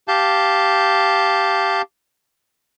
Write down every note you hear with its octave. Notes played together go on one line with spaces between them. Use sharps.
G4 F5 A5 G6